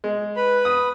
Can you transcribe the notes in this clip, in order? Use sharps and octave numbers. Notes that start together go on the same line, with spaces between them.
G#3
B4 B5
D#6